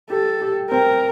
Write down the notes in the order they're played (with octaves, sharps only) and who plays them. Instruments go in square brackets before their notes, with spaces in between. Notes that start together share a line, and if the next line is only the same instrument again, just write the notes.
[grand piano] G4 [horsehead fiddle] A4
[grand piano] G4
[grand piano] C4 [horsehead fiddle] A#4